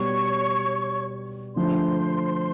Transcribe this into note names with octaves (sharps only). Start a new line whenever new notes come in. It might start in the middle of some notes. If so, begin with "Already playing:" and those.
Already playing: B2 G3 B3 C#5 C#6
D3 F3 A3 C5 C6